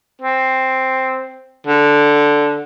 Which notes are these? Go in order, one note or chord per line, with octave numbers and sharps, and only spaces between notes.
C4
D3